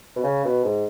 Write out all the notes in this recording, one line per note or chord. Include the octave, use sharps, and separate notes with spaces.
B2
C#3
B2
G#2